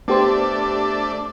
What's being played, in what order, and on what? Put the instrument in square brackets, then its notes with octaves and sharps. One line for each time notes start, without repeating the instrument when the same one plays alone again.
[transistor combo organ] A3 D4 [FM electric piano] B3 G4 C5